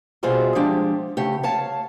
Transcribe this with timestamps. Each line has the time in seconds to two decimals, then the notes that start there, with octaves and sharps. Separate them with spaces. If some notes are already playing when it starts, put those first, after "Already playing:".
0.23 B2 G3 F4 G#4 C5 E5
0.55 F3 G#3 D4 G4
1.17 C#3 A3 G4
1.43 C#5 F5 A5